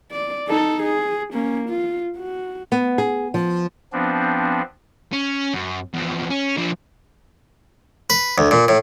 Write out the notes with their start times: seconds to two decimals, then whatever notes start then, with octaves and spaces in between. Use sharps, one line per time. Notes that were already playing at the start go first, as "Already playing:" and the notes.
0.12 D5
0.48 D#4 A4
0.83 G#4
1.33 A#3 C#4
1.70 F4
2.17 F#4
2.72 B3
2.98 G#4
3.34 F3
3.93 F3 B3 C4 D4
5.13 C#4
5.54 F#2
5.94 E2 F3
6.30 C#4
6.58 F3 D4
8.10 B4
8.38 D2
8.51 A#2
8.68 A2